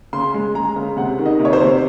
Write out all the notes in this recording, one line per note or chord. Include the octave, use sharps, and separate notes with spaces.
C#3 C6
G#3
G#3 A#5
C#3
C3 F#5
D#3
D#5
C3
C#5
C5
C3